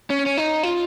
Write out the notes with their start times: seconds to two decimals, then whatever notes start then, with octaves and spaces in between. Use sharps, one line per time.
0.10 C#4
0.26 C#4
0.37 D#4
0.63 F4